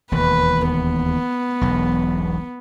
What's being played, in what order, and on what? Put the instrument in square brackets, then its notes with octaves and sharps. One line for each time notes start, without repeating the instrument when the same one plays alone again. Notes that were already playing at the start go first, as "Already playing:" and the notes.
[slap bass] E1 D#2 [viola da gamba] B4
[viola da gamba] B3
[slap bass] E1 B1